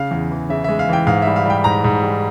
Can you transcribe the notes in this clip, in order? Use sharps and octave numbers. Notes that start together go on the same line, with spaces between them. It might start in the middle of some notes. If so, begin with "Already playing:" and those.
Already playing: C#3 F5
E2
E3
C#3 E5
G#3 E5
F5
E3 G5
G#2 F5
G3 E5
F5
G3 G5
G#2 A#5
G#2
G3